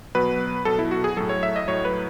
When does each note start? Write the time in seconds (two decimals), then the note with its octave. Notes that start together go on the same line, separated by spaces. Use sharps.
0.15 B2 F#3 B4
0.65 B2 F#3 A4
0.79 E4
0.91 F#4
1.04 G#4
1.17 A2 F#3 A4
1.29 C#5
1.43 E5
1.56 D#5
1.68 A2 F#3 C#5
1.85 B4